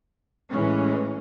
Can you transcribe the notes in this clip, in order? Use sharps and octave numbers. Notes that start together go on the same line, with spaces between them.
A1 E3 G#3 C#4